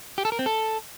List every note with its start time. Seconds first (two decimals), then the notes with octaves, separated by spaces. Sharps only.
0.18 G4
0.25 A4
0.32 A#4
0.39 C4
0.46 A4